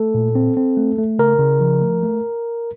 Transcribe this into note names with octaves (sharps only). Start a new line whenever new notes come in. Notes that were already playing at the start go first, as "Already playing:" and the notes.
Already playing: A3 A4
A#2
C4
C4
A3
A3
C#3 A#4
C#3
F3
A3
A3